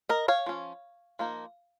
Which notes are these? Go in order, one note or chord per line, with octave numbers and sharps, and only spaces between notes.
A#4 D#5
C#5 F5
F3 C#4
F3 A#3 D#4